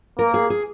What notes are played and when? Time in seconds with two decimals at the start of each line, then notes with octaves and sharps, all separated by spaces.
0.19 A#3 A#4
0.34 G#4
0.50 G#4